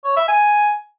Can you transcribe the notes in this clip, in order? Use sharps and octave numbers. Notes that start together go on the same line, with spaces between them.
C#5
E5
G#5